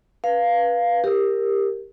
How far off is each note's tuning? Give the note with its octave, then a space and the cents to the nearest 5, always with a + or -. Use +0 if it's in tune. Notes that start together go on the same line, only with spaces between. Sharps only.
B4 -20 F5 +0
G4 +15 A#4 -5